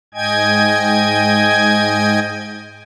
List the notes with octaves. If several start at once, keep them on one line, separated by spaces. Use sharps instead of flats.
G#2 D#5 G5 G#5 G#6